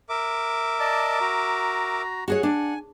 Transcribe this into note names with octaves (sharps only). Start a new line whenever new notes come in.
A#4 E5 D6
D5 D#5 A5
F#4 A#5
F#4 G#4 C#5 F#5
D4 G#5